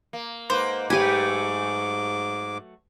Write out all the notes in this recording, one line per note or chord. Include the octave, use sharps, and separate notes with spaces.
A#3
G#2 A#3 B4 C5
G#2 F#3 A3 G4 B4 G#5 D6